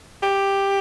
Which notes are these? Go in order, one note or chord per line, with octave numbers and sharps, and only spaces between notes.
G4